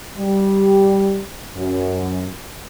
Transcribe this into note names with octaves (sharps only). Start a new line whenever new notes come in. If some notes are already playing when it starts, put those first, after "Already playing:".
G3
F#2